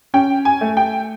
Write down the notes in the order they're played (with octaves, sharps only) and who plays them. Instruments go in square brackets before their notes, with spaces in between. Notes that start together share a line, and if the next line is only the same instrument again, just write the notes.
[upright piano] C#4 G5
G#5
A3
G5